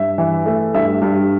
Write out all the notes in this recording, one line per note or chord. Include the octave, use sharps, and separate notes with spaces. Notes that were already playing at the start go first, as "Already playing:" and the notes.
Already playing: G2 E5
E3
A3
G2 E5
G2